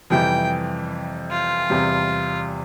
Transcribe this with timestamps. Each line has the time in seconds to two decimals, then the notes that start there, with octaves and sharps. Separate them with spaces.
0.10 F2 C3 E3 G3 G5
1.30 F4
1.70 E2 C3 G3